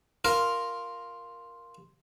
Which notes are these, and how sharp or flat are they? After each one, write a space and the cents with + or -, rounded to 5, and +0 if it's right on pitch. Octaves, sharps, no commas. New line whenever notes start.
F4 +0 A#4 +0